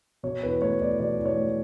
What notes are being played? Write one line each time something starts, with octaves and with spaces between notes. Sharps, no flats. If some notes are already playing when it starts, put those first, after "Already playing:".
B2 C#5
E2 B4
A3 C#5
E2 D5
B2 D5
E2
C#5
A3